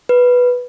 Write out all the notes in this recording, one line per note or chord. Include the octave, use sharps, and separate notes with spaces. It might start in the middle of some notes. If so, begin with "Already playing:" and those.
B4